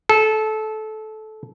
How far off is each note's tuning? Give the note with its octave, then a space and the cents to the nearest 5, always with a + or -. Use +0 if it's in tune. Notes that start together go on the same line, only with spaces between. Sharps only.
A4 -20